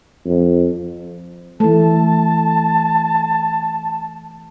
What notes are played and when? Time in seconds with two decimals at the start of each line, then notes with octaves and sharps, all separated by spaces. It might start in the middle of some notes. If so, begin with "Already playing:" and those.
0.25 F2
1.60 E3 A3 A5